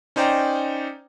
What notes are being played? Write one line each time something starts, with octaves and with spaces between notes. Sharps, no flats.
C#4 D#4 C5 D5 G5 A#5